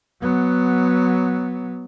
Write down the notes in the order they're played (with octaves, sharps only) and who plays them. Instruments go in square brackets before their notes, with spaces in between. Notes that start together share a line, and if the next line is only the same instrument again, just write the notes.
[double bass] F#3 B3